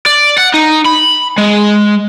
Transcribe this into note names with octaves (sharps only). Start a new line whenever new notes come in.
D5
F#5
D#4
B5
G#3